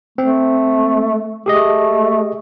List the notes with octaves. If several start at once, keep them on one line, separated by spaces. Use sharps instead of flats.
A3 C4
A3 G4 G#4 D#5